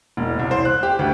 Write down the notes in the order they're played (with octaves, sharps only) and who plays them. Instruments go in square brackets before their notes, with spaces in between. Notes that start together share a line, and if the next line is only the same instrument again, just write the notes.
[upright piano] E1
C2
C5
F#6
G4
D2